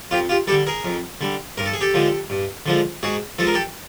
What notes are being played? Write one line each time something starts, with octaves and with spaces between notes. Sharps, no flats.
F2 F4 G4
F4 G4
D3 G3 G4 A4
G#4 A#4
F2
D3 G3
G2 A#4
A4
G#4
G4 A4
D3 F3 G#3
G2
D3 F3 G#3
G#2 F#4 G#4
F3 G#3 A4
A#4
G4 A4